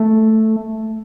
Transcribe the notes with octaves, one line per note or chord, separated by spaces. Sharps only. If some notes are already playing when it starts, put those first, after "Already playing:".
Already playing: A3